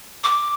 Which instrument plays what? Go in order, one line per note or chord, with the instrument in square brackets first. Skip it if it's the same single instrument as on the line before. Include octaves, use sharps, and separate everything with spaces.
[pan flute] D6